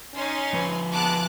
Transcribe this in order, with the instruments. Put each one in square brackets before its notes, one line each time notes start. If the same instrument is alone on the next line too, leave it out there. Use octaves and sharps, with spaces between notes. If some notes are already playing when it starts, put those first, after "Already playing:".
[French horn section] C#4 [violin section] D#4 C6
[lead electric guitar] F3 B4
[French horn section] G#3 B3 [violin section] A5 D6 F#6